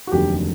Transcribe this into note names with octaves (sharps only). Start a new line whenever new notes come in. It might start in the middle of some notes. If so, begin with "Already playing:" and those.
F#4
F1 D#2 D3 F#3 G4